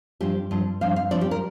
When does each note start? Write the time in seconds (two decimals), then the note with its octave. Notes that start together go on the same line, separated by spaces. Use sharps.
0.21 G2 F3 C4 G4
0.51 G2 F3 C4
0.81 G2 F3 C4 F5
0.96 F5
1.11 G2 F3 C4 D5
1.21 G4
1.31 A#4